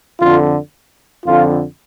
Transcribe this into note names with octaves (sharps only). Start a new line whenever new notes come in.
F2 D3 F4
F2 D3 F4